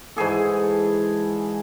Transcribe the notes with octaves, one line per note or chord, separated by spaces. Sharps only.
G#2 E3 G#4 A4